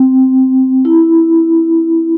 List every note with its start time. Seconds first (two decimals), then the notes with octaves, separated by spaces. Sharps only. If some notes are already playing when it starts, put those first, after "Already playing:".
Already playing: C4
0.85 E4